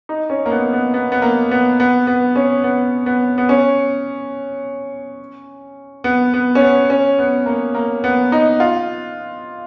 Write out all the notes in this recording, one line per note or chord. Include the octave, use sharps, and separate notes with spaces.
D#4
C#4
A#3
B3
B3
B3
B3
A#3
B3
B3
B3
C#4
B3
B3
B3
C#4
B3
B3
C#4
B3
C#4
B3
A#3
A#3
B3
D#4
F4